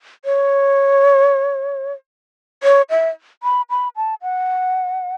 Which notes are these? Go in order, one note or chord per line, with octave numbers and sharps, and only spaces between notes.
C#5
C#5
E5
B5
B5
A5
F#5